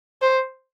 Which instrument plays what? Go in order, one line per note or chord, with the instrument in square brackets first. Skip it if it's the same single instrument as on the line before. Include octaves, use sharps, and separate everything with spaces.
[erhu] C5